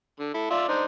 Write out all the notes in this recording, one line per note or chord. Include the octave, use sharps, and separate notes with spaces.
D3
E4 A4
F4 D5 E5
D4 D#4 C5